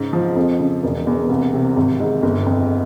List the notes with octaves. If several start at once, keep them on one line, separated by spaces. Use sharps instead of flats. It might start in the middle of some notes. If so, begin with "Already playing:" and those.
Already playing: G#2 C#3
F3
F2
C#3
E1
E2
C2
C3
G#1
G#2
G1
F2